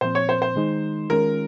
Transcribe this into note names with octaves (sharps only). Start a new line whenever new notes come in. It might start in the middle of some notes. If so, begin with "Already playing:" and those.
A#2 F3 C4 C5
C#5
C5
C5
D#3 G#3 D#4
D#3 G#3 C#4 F4 A#4